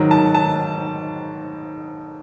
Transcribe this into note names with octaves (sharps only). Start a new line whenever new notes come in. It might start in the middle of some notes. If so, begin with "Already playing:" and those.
Already playing: G#2 D#3 F#3
A5
A5